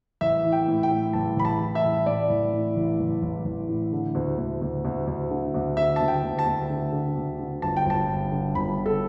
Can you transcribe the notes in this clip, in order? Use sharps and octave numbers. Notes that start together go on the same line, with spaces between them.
A1 E5
E3
G5
A2
G5
A2
A1 A5
A1 B5
A5
E3
E5
A1
A2 D5
A1
A2
A1
A1
A1
A1
A2
D3
D2
D2
D2
D2
D2
D3
D2
D3 E5
D2 A5
G5
D2
A5
D2
D3
D3
D2
D3
G1 A5
G5
G1 A5
G2
D3
G1 B5
D3
A4